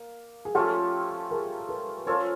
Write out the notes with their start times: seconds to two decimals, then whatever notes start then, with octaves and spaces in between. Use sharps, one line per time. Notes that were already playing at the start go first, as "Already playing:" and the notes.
Already playing: A#3
0.45 G#4
0.55 F3 A3 C#4 F4 G4 A4
1.31 G#4 A#4
1.69 A4 B4
2.07 C#4 F4 A4 A#4 C5 C#5